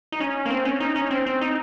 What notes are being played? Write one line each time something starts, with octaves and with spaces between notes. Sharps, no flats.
D#4
C#4
A#3
C4
C#4
D#4
C#4
C4
C4
D#4